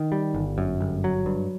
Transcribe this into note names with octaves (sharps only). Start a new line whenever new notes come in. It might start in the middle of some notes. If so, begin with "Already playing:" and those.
Already playing: D#3
G3
G1
F#2
G1
F#3
G2